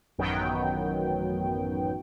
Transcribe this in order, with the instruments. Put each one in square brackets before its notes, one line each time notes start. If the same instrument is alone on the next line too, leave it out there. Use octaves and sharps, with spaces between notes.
[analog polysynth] A1 F#2 D#3 F#3 B3 G5